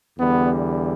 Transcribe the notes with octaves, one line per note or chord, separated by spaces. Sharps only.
E2 D3 G3 B3